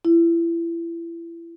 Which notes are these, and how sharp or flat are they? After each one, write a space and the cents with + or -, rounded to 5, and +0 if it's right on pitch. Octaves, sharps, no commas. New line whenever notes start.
E4 +30